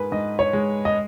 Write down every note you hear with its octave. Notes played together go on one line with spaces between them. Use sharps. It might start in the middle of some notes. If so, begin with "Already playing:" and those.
Already playing: G#2 G#4 A#4 B4
G#2 D#5
C#5
G#3
D#5